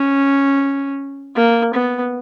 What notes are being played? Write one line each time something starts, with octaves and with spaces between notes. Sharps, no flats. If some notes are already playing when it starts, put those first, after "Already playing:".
Already playing: C#4
A#3
B3